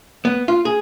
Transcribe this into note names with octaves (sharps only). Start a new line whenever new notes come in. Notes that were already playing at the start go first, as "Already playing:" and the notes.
B3
F4
G#4